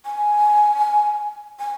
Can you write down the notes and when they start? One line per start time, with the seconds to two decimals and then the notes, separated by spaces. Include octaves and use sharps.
0.05 G#5
1.59 G#5